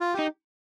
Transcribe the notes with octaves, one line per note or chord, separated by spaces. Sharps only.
F4
D#4 G4